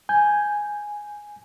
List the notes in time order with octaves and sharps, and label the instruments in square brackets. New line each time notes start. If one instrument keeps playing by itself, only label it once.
[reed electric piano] G#5 G6